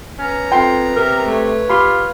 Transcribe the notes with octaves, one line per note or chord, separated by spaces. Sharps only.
B3 C#4 A#5
F2 G5 C6 C7
C3 A#4
A3 B4 C#5
F4 G4 B5 C6